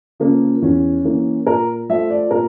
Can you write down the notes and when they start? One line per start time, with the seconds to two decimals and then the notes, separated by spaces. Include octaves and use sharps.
0.20 C#3 F3 A#3
0.62 E2 C#4
1.04 E3 A#3
1.46 A#2 A#4
1.90 F3 A3 E5
2.10 D5
2.31 A#2 A#4